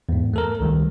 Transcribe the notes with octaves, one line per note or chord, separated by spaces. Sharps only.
E2 G#2
A3 A4 A#4
C#2 D#3 G3